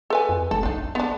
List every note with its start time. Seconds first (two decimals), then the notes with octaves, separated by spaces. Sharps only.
0.10 A4 B4 G#5
0.29 F2
0.51 F1 A4
0.63 B1 D4 D#4
0.95 B3 D4